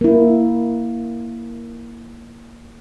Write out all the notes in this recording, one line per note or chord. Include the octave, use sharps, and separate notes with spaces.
A#3 E4